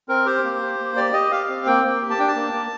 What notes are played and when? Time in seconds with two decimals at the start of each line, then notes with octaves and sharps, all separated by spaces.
0.09 C4 A#4
0.26 G4 C5
0.44 A#3
0.61 G4
0.79 A#3
0.96 G4 D5
1.13 G4 D#5
1.31 G4 F5
1.49 C4
1.66 A#3 G5
1.84 A#3
2.02 G4
2.10 A5
2.19 D4 G5
2.28 A5
2.36 A#3
2.53 A#3